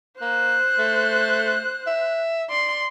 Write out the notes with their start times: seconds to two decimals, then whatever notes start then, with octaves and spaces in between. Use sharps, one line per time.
0.21 A#3 C5 F#6
0.78 A3
1.87 E5
2.50 D5 C6